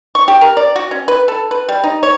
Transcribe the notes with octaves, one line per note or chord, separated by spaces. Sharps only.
C#6
G4
A#4
D5
F#4
C#4
B4
A4
B4
G3
D#4
C#5